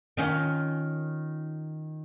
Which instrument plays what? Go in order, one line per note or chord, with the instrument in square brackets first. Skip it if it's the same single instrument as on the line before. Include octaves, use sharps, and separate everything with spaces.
[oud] D#3 C#4 F4